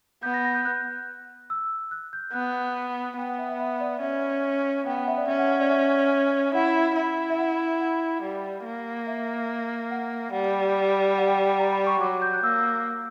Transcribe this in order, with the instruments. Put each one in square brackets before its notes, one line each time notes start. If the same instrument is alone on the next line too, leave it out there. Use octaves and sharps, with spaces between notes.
[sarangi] B3 [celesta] G6
[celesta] A#6
A#6
G6
F#6
E6
F#6
G6
[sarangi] B3 [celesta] F#6
[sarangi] B3 [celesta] G5
[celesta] F#5
E5
E5
E5
D5
[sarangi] C#4 [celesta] E5
[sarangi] B3 [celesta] G5
[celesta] F#5
E5
D5
[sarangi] C#4 [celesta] E5
[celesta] F#5
F#5
D5
E5
[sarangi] E4 [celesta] F#5
[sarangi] E4
[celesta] E5
F#5
F#5
[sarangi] G3
A#3
[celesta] E5
F#5
[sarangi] G3 [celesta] F#5
[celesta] F#5
G5
G5
G5
A#5
B5
C#6
[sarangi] F#3 [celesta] D6
[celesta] G6
F#6
[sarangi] A#3 [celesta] E6